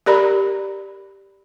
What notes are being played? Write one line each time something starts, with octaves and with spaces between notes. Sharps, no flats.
G4 A#4 D5 A#5 B5